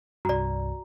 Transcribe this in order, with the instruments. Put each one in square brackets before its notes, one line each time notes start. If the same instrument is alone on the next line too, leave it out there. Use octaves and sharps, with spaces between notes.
[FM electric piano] C2 G2 [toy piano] F#4 D5 [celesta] A#5